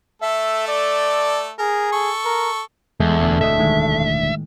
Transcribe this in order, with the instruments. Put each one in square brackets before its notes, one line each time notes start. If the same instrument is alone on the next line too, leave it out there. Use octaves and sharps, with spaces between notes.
[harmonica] A3 A4 [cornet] E5
[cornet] D5
[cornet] G#4 [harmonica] A#4
[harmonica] A4 C#6
[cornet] A#4
[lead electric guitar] E2 [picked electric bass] G#3 [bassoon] A3
[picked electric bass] E1 D2
[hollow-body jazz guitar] A4 D#5 [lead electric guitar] E5
[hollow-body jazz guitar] A2 D#3 G#3